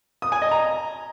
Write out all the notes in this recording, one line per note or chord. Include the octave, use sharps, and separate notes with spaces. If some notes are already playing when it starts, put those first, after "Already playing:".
D#6
G#5
D#5
A#5